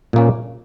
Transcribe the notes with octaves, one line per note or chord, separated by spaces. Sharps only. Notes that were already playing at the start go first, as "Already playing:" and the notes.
A#2 A#3 C#4